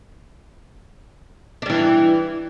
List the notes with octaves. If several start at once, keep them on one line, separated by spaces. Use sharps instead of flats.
E3 G3 D4